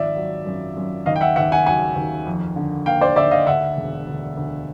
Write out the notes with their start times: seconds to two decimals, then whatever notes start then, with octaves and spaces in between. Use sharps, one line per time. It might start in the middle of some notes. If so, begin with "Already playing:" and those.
Already playing: G#1 F3 D5 E5
0.16 F#3
0.46 F#2
0.77 F#2
1.06 D#2 D#5 F5
1.16 G5
1.21 E5 F#5
1.36 D#2 E5 F#5
1.52 F#5 G#5
1.66 F#3 F#5 G#5
1.96 D#2
2.27 F2
2.56 D3
2.86 A#3 F5 G5
3.01 C5 D5
3.16 D3 D5 E5
3.31 D#5 F5
3.47 D2 E5 F#5
3.77 E1
4.07 D2
4.37 D2